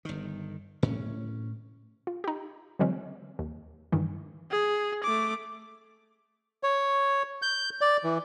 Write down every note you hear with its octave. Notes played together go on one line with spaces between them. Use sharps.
G1 D#3
A2 C#4
F4
D#4 G4
D3 E3 F#3 G#3 C4 C#4
D#2
G2 D#3 E3
G#4
A3 D6
C#5
G6
D5
E3